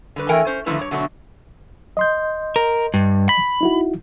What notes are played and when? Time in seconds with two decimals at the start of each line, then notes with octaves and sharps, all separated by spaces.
0.16 D3 G3 B4
0.29 E3 A3 A#4 G5 G#5
0.47 C#4 C5
0.66 D3 D#3 F3 A3 E4 B4
0.79 G2 C#5
0.91 B2 D3 F#3 A3
1.97 D#5 C6 G6
2.56 A#4
2.94 G2
3.29 B5
3.61 D#4 E4 F#4